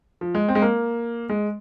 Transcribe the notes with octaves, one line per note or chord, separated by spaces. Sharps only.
F3
G#3
C4
G#3
A#3
G#3